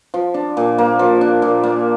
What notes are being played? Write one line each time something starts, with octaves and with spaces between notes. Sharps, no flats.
F3
D4
A#2
A#3
F3
D4
A#2
A#3